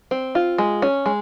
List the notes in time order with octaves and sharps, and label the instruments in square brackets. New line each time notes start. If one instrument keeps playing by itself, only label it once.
[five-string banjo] C4
F4
G#3
C#4
G#3